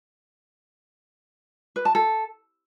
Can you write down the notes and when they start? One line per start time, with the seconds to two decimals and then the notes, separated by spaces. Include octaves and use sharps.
1.76 B4
1.85 A5
1.95 A4